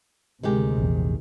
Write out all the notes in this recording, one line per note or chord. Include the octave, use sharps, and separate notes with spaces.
D2 C3 D#3 G#3 G4
A#1 E2